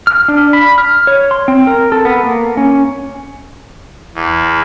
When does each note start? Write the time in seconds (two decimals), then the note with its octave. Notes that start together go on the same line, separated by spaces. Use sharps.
0.07 F6
0.28 D4
0.53 B5
0.78 F6
1.07 C#5
1.31 C6
1.48 C4
1.67 A#4
1.92 A4
2.05 B3
2.23 A#3
2.57 C#4
4.15 E2